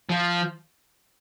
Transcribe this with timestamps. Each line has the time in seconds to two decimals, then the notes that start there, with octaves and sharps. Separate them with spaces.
0.09 F3